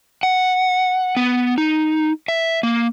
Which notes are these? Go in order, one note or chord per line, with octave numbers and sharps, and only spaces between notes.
F#5
B3
D#4
E5
A#3